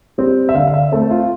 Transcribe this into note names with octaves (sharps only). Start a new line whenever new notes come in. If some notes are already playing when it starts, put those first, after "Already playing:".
G3 C4
E5
D3 F5
F5
E5
A3 C4 A4
F4